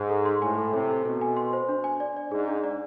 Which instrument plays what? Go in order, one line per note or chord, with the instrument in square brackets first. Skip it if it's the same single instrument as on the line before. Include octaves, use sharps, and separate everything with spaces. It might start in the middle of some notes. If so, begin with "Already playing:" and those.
Already playing: [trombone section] G#2
[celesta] A4
C6
[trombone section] A2 [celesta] G#5
[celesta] A4
[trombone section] C3 [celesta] A4
[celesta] A4
[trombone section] B2 [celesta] A4
[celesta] G#5
C6
C5
D4
G#5
D5
D5
[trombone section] G#2 [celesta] G#4
[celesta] D4
D5